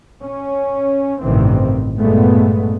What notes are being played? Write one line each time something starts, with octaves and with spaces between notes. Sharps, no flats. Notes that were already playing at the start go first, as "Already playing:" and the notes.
C#4
A1 G2 C3 D#3 E3 C4
G2 A#2 G#3 A3 B3